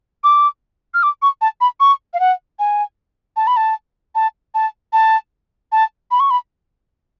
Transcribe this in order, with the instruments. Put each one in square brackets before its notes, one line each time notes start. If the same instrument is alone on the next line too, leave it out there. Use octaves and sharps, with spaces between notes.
[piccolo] D6
F6
D6
C#6
A5
B5
C#6
F5
F#5
G#5
A5
B5
A5
A5
A5
A5
A5
B5
C#6
B5